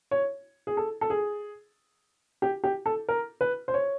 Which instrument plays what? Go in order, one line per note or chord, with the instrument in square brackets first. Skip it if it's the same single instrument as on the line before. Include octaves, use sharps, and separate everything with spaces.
[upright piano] C#5
G#4
A4
A4
G#4
G4
G4
A4
A#4
B4
C5
C#5